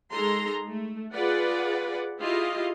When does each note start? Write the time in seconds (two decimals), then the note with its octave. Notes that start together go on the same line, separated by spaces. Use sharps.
0.11 G#3 D#4 A4 A#5 C6
0.66 A3
1.12 F4 G#4 B4 D5 F#5
2.21 E4 F4 G4 G#4 D#5 F5